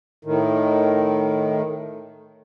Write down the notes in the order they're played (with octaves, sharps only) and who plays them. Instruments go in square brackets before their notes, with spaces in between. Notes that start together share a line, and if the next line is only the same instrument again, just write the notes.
[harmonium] A2 D#3